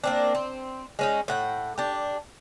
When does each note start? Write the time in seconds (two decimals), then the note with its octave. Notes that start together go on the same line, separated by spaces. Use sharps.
0.04 A#3 C4 D4
0.35 C4
0.99 G#3 C#4 D#4
1.28 A2 F#5 G5
1.78 D4 G4